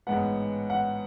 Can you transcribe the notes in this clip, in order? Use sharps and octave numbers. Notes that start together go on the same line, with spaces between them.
A1 G#2 G#3 B3 F#5
F#5